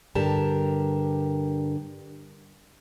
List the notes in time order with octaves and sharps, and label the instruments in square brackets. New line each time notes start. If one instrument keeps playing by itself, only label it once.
[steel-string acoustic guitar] G2 D3 G4 A#4 A5